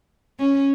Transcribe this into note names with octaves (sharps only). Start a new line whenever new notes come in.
C#4